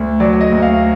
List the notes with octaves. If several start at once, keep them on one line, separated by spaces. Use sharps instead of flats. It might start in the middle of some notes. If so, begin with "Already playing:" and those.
Already playing: D2
F#3 D5
D#5
D2
F5